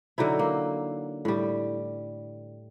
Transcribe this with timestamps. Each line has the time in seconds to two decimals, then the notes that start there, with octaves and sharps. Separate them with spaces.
0.18 D3 F#3 D#4 E4
0.39 A#3
1.25 A2 G3